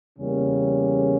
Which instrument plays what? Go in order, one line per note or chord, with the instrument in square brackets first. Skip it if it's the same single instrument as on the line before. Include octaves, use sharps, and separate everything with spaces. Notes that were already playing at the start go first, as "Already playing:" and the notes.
[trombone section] E2 C#3 G3 A#3 C#4